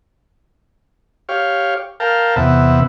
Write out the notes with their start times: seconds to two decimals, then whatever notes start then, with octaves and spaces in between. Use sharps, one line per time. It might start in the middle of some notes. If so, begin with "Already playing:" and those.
1.29 G4 C#5 F5
2.00 A#4 F5 G5 A5
2.36 E2 C3 B3 E5 F#5